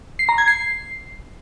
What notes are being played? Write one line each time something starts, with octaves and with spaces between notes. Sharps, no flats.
C7
A#5
G#6
C7